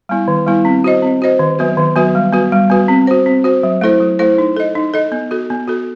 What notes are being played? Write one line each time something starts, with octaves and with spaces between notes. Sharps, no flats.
G3 B3 E4
D#3
G3 B3 E4
C4
F#4 C5 D#5
C4
F#4 C5 D#5
D#3
F#3 B3 F#4 B4
D#3
F#3 B3 F#4 B4
G3
B3 F#4 B4
G3
B3 F#4 B4
C4
F#4 C5
C4
F#4 C5
F#3
A3 E4 A4 C5
F#3
A3 E4 A4 C5
D#4
A4 D#5
D#4
A4 D#5
B3
F#4 A4
B3
F#4 A4